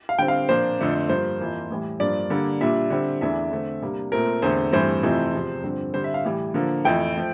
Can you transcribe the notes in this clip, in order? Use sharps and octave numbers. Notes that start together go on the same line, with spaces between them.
F5
D3 G3 C4 G5
F5
A#2 F3 A#3 D4 C5
F2 D3 A3 D4
G2 F3 A#3 C5
F2 E3 A#3
A2 E3 G3
G2 F3 A#3 D4 D5
D3 G3 A#3
A#2 G3 D4 E5
D3 G3 C4
E2 E3 A3 D4 E5
D3 A3 C4
C3 G3 A#3 D4
A#2 A3 C4 A#4
E2 D3 A3 C4 C5
G2 E3 A3 C4 C5
F2 C3 E3 A3 C4
E2 C3 F3
G2 D3 F3 C4
D3 G3 C4 C5
E5
F5
A2 E3 G3
D3 F3 A#3
F2 E3 A3 G5
F3 A3